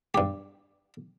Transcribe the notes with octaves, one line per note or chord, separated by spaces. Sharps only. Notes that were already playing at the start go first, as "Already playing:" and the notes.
G2 G4